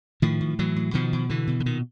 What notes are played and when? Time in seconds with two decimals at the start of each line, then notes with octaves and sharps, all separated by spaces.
0.22 A2 D#3 F3
0.41 A2
0.59 A2 E3 F#3
0.76 A2
0.94 B2 D#3 F3
1.13 B2
1.29 B2 D3 E3
1.47 B2
1.60 D3
1.66 A#2 D#3